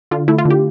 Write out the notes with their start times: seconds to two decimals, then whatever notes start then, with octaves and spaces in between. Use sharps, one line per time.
0.11 D3 F4
0.28 A3 E4
0.38 F4
0.45 D3
0.51 G4